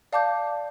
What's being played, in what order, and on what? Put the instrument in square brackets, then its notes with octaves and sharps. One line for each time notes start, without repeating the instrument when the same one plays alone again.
[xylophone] D5 F5 A5 D6 G6